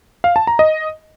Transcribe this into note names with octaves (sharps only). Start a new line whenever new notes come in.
F5
A5
A#5
D#5